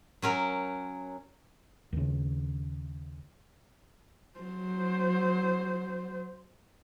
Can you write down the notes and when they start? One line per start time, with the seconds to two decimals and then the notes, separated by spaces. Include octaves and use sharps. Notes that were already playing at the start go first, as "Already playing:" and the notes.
0.22 F#3 C#4 A#4
1.93 D#2 C#3
4.39 F#3 C5